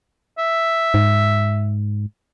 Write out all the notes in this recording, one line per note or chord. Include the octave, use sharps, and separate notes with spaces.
E5
G#2